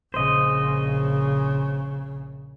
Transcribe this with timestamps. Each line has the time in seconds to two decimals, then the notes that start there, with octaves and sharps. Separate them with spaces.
0.14 A#1 C#3 C5 D#5